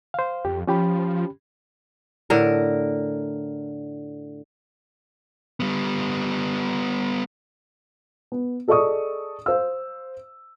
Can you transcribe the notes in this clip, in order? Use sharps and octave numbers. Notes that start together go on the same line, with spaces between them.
C5 F5
F2 G4
F3 C#4 G4 B5
A2 D3 A#4
G3 B3
B3
G#4 A4 D5 D#5 C#6 D#6
C5 F5 E6